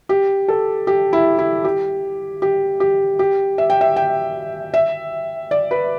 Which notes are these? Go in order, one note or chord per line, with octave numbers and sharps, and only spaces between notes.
G4
A4
G4
E4
E4
G4
G4
G4
G4
E5
G5
E5
G5
E5
D5
B4